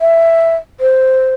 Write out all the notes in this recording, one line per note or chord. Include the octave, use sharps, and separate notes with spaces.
E5
C5